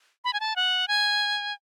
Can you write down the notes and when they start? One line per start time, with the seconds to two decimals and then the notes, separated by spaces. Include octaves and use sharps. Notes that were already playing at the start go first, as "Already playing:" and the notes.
0.24 B5
0.33 G#5
0.40 A5
0.56 F#5
0.88 G#5